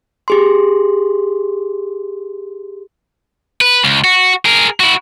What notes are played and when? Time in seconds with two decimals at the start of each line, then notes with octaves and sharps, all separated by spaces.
0.28 G4 G#4 C6
3.61 B4
3.84 C#2
4.04 F#4
4.45 G#4 A#4
4.80 E4 F#4